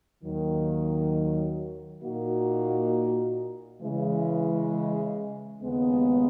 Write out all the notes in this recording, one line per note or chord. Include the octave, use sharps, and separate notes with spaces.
D#2 D#3 F#3
A#2 A#3 D#4 F#4
C#3 E3 G#3
D#2 C#3 G#3 B3